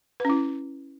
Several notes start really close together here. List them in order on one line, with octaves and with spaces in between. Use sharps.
B4 C#4 E4